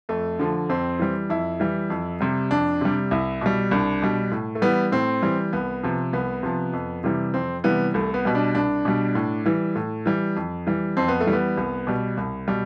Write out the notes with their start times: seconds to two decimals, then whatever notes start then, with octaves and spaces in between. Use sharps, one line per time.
0.09 F2 A3
0.39 D3 F3
0.69 F2 C4
0.99 E3 G3
1.30 F2 E4
1.60 E3 G3
1.90 F2
2.21 C3 G3
2.51 F2 D4
2.81 C3 G3
3.11 C2 E4
3.41 B2 G3
3.71 C2 D4
4.02 B2 G3
4.31 A2
4.55 A3
4.62 E3 G3 B3
4.92 A2 C4
5.22 E3 G3
5.53 C2 B3
5.83 C3 F3
6.13 C2 B3
6.43 C3 F3
6.73 F2
7.04 C3 E3 G3
7.34 F2 C4
7.64 C3 E3 G3 B3
7.94 C2 A3
8.14 B3
8.25 B2 G3
8.35 D4
8.55 C2 D4
8.85 B2 G3
9.15 A2
9.46 E3 G3
9.76 A2
10.06 E3 G3
10.36 F2
10.67 E3 G3
10.97 F2 C4
11.08 B3
11.21 A3
11.27 E3 G3
11.33 B3
11.57 C2
11.87 B2 G3
12.17 C2
12.48 B2 G3